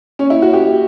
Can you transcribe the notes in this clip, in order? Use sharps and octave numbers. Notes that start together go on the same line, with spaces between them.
C#4
E4
F#4
G4